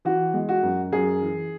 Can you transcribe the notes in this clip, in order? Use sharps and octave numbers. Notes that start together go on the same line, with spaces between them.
E3 F#4
G#3
F#4
F#2
F#2 G#4
E3